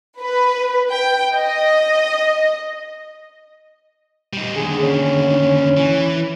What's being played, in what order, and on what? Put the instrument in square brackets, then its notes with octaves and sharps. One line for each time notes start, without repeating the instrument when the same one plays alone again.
[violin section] B4
G5
D#5
[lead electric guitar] G3 D#4
[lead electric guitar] D#2 D3 [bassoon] G#4
[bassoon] C#4
[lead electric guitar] E3